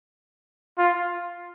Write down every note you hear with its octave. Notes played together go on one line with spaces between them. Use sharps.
F4